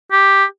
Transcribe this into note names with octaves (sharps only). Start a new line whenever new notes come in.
G4